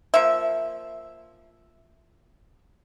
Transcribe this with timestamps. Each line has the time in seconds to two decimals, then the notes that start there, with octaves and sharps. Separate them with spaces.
0.14 F3 A#3 E5